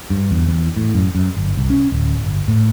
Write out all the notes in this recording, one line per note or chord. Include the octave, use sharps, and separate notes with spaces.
G2
E2
E2
A2
F#2
F#2
G1
C2
C#4
D1
G1
A2